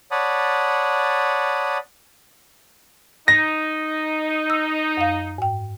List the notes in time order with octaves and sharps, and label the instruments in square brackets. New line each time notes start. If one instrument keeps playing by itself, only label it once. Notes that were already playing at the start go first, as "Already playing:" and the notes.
[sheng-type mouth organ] C#5 D5 F#5 A5 B5 D#6
[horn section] D#4 [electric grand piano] A#6
[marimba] E6
F#2 F5
G#2 G5